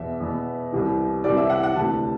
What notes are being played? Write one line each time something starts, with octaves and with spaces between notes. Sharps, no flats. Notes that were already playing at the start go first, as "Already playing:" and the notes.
Already playing: E2 B2 E5
E2 B2
C2 C3 E3
C2 C3 E3 D5
E5
F#5
F#5
D2 C3 E3 A5